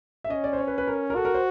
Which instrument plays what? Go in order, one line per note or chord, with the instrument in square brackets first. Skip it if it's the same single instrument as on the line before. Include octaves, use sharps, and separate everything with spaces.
[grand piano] E5
[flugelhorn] C#4 [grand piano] D#5
[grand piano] D5
C5
C#5
B4
B4
A#4
A#4
[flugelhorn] F#4 [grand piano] A4
[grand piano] A#4
C5